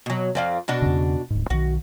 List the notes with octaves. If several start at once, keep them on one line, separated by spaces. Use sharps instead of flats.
B2 F#3
F2 D5 F5
B2 D4 F#4
E2 C#3
D1 G#2
B1 D#3 F#4